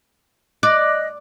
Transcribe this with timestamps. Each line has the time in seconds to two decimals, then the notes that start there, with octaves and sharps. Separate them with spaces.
0.63 D5 D#5 F#6